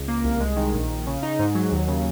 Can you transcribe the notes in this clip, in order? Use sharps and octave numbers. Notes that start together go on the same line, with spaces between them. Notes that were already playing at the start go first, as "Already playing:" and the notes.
Already playing: C#2
A#3
C2
G#3
D#3
A#1
A#1
C#3
D#4
G#2
F#3
D#2
C#3